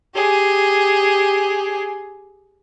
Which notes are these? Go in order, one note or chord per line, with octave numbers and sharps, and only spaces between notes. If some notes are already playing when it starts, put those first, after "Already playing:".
G4 G#4